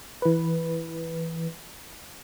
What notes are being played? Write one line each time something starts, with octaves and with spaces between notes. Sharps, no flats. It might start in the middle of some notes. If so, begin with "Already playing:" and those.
E3 B4